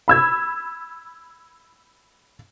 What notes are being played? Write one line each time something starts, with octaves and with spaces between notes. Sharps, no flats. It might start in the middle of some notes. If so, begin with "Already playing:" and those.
B5 E6 G#6